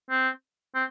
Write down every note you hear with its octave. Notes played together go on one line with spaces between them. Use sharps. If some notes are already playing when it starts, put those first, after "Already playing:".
C4
C4